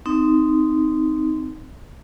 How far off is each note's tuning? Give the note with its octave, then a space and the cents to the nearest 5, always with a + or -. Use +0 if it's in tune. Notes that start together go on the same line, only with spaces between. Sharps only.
C4 -15 D#4 +0